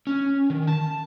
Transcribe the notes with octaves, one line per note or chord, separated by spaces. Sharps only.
C#4
D#3
A5